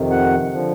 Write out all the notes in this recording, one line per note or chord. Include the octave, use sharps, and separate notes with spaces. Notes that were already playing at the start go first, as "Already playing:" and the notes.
Already playing: F2 C3 D#3
F#5
D3 F3